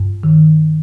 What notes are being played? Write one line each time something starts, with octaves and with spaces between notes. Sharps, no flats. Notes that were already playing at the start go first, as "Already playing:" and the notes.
Already playing: G2
D#3